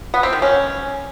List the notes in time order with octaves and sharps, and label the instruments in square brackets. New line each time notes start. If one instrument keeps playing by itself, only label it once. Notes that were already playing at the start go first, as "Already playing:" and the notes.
[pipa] B3
C4
D#3
C#4